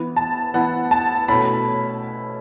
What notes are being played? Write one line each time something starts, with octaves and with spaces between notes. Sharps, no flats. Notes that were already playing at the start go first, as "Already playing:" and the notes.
Already playing: E3 B3 E4
A5
E3 B3 E4 F#5
A5
B2 A3 C#4 E4 B5